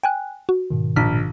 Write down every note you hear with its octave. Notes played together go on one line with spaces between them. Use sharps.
G5 G#5 F#6
F#4
G#2 B2 D#3
A#1 F6 B6